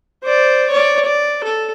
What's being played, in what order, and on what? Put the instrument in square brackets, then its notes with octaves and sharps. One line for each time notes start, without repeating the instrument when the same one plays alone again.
[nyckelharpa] C5 D5
C#5 D5
D5
A4